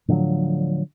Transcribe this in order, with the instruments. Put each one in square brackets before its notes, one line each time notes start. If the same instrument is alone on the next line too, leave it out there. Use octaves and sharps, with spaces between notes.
[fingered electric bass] A2 D3 F3 F#3